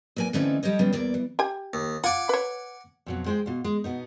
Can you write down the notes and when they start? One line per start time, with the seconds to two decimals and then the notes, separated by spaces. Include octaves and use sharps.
0.16 E2 A#3 G#5
0.33 D3 E3 A3 C4 C#4 D#4
0.63 G3 G4 A4 C#5 D#5
0.79 C#3 G3 B3 F4
0.93 E2 A#3 D5
1.14 E3
1.39 G4 G#5
1.74 D#2
2.04 F4 F#5 G#5 D6
2.29 B4 C#5
3.06 F2 B2 F#3
3.26 G#3 C5 C#5 G5
3.46 B2 F4
3.64 G#3
3.84 B2 B3 D#4